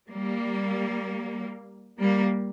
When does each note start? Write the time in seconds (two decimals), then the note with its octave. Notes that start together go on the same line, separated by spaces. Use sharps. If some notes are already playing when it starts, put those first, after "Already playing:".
0.10 G3 A#3
2.00 G3 A#3